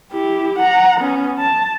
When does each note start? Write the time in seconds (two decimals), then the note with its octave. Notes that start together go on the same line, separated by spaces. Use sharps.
0.12 E4 G4
0.59 F#5 A#5
1.00 B3 C#4
1.39 A5